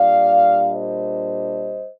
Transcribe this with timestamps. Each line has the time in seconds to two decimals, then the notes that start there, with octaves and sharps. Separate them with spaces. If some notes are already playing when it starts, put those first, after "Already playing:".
Already playing: A#2 G3 D4 D5 F5
0.71 C5 D#5